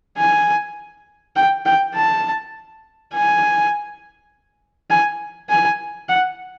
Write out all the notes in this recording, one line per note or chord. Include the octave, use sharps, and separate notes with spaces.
G#5
G5
G5
A5
G#5
G#5
G#5
F#5